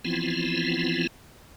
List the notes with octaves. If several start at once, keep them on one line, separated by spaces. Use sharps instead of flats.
E3 F3 B3 C4 E4 F4